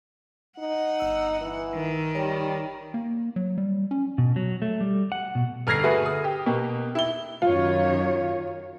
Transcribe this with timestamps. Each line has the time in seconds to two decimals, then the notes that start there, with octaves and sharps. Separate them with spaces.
0.59 D#4 F#5
1.00 G1 E6
1.41 E3
1.74 D#3
2.15 G3 C#5
2.94 A#3
3.36 F#3
3.58 G3
3.91 C#4
4.18 B2
4.36 F#3
4.62 A3
4.81 G3
5.12 F#5
5.35 B2
5.67 G1 F6 G#6 A#6 C7
5.83 A3 F#4 G#4 B4
6.06 D#6
6.24 G4
6.46 B2 A#3 G4
6.95 E4 G7
7.42 F#2 D#3 F4 C#5